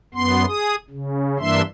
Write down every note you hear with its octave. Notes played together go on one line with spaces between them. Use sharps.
F#2 B3 C6
G#4 D#6
C#3
G2 E3 A#3 D4 E5 C6